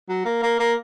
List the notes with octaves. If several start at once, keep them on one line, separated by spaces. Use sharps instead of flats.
F#3
A#3
A#3
A#3